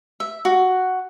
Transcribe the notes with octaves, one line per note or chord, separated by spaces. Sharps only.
E5
F#4